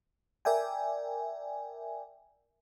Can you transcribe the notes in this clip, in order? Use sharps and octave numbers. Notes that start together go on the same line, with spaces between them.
A#4 D5 E5 G5 G#5